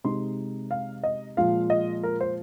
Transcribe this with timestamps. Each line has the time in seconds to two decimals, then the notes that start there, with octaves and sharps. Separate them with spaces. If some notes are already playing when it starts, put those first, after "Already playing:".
0.04 C3 G#3 D#4 C6
0.71 F5
1.03 D#5
1.37 A#2 F3 G#3 F4 F5
1.70 D#5
2.03 A#4
2.21 C5